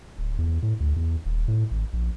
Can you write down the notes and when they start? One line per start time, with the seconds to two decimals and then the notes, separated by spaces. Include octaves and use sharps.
0.18 D1
0.38 E2
0.63 A2
0.80 D2
0.96 E2
1.25 D#1
1.48 A2
1.71 G#1
1.93 A#1